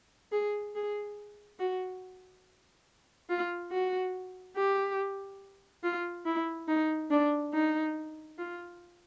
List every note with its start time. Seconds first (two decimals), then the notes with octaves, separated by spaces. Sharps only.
0.32 G#4
0.75 G#4
1.59 F#4
3.29 F4
3.71 F#4
4.57 G4
5.84 F4
6.26 E4
6.68 D#4
7.11 D4
7.53 D#4
8.38 F4